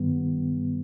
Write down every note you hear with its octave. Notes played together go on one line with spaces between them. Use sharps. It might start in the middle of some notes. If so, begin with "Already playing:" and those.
Already playing: G2 D#3 G3 B3